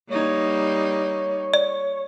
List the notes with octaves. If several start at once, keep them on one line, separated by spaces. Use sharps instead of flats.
G3 A#3 D#4 C#5
D5